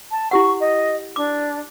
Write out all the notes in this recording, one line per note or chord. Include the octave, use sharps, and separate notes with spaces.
A5
E4 G4 F#5 C#6
D#5
D4 D6